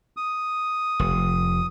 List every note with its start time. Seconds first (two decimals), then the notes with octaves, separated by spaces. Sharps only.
0.17 D#6
0.99 F1